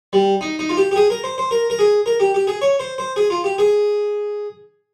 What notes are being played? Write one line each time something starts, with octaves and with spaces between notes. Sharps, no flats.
G3
D#4
D#4
F4
G4
G4
G#4
A#4
C5
C5
A#4
A#4
G#4
A#4
G4
G4
G#4
C#5
C5
C5
G#4
F4
G4
G#4